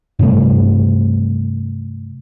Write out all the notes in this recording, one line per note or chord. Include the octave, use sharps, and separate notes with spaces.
G2 C3 G3 A3